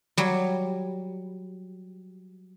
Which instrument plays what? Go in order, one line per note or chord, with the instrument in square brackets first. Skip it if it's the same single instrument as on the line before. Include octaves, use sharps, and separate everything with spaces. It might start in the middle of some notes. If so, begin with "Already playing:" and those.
[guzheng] F#3 G3